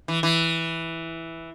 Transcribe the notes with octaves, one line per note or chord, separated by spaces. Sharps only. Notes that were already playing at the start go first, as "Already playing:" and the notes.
E3
E3